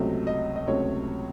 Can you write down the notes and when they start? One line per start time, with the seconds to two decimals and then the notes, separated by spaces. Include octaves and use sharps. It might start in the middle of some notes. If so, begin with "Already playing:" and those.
Already playing: C#2 C3 F#3 A3
0.27 D#5
0.56 D#5
0.67 C#2 C3 F#3 A3 C#5